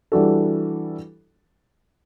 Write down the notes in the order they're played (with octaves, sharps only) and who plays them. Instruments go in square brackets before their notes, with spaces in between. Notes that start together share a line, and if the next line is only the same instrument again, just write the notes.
[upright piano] E3 G3 D4 F#4 A4